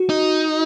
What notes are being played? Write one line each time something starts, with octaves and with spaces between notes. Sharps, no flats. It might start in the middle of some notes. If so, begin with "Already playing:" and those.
Already playing: F#4
D#4